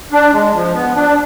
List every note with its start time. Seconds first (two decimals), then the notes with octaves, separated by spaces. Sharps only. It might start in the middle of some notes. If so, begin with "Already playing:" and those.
0.12 D4
0.33 G#3
0.54 F3
0.74 B3
0.95 D4